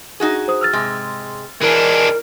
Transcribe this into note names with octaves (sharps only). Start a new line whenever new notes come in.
D#4 F#4 G#4
C5 D#6
E6 F6 A6
G#2 C3 G#3
E3 G#3 D4 A#4